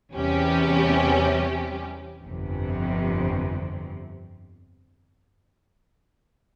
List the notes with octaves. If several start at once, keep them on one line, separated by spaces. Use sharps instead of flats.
E2 C3 G3 C#4 G4
G1 F2 C3